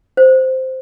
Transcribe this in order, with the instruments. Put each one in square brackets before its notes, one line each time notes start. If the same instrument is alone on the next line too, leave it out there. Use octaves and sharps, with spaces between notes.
[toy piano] C5